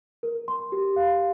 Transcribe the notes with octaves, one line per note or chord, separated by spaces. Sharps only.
A#4
C6
G4
F5